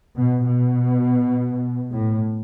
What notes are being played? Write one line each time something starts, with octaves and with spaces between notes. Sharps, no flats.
B2
B2
A2